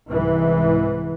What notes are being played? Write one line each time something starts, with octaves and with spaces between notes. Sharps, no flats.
C2 G#2 E3